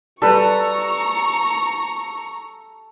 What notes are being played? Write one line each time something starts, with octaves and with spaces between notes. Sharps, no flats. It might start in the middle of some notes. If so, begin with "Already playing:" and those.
G3 A4 B4 A#5 C#6